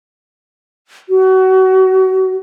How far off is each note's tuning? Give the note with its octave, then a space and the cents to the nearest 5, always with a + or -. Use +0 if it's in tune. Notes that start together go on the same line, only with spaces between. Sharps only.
F#4 +30